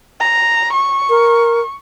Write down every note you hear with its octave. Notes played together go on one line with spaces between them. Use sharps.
A#5
C#6
A#4